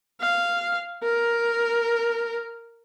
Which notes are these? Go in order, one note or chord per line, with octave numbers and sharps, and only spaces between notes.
F5
A#4